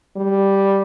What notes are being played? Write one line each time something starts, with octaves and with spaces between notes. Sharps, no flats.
G3